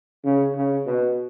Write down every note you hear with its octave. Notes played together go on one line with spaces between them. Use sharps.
C#3
C#3
B2